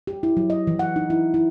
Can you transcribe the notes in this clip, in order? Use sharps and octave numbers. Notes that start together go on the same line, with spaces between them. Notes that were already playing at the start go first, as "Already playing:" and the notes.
G4
E4
F#3
D#5
E3
F#5
D#4
E4
E4